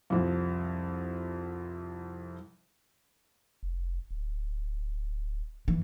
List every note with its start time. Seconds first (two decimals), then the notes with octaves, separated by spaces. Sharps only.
0.10 C2 F2
3.63 F1
4.11 D1
5.68 F#2 E3